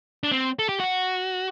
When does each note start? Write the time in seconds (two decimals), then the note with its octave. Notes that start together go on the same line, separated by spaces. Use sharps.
0.24 D4
0.32 C4
0.59 A4
0.69 G4
0.80 F#4